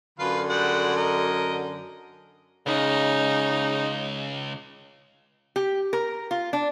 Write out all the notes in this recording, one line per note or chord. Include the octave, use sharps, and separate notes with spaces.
F#2 D3 F4 B4 F5
G3 G#3 F#5
A#4 D#5
C#2 C#3 D#4
G4
A#4
F4
D4